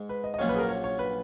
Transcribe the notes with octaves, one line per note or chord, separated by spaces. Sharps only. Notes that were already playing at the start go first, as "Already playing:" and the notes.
Already playing: G#2 G#3
B4
D#5
D#5
A#1 A#2 F#3 C#4 F4 C#5
B4
G#4
A#4
C#5
C#5
B4